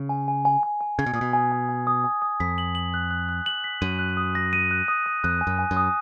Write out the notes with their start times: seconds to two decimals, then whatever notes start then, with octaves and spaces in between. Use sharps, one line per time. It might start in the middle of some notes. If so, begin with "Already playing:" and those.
Already playing: C#3
0.09 G#5
0.28 G#5
0.45 G#5
0.63 G#5
0.81 G#5
0.99 C#3 G#6
1.06 B2
1.13 A#2 D#6
1.21 B2
1.33 G#5
1.52 G#5
1.69 G#5
1.87 D#6
2.04 G#5
2.22 D#6
2.40 F2 B6
2.58 F#7
2.75 F#7
2.94 F#6
3.11 F#6
3.29 F#6
3.46 F#7
3.64 B6
3.82 F#2 D#7
3.99 F#6
4.17 D#6
4.35 A#6
4.53 D#7
4.71 F#6
4.88 D#6
5.06 D#6
5.24 F2 F#6
5.41 G#5
5.47 F#2
5.59 G#5
5.71 F#2
5.77 D#6